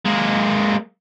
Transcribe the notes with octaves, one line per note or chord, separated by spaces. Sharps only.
G#3 A#3